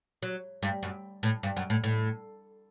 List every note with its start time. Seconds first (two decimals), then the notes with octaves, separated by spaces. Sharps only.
0.23 F#3
0.63 G2
0.83 F#2
1.23 A2
1.43 G2
1.56 F#2
1.70 A2
1.84 A2